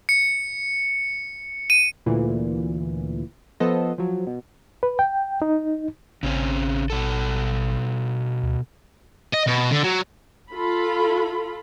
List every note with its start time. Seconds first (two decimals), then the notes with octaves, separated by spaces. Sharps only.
0.09 C#7
1.70 D#7
2.06 D2 A#2 E3
3.60 F3 B3 A4 C5 D#5
3.98 F3 F#3
4.27 B2
4.83 B4
4.99 G5
5.42 D#4
6.23 A1 C#3 C4 C#4
6.90 B2 A4
8.43 D2
9.34 D#5
9.47 B2
9.71 D3
9.84 F#3
10.51 F4 A4 B5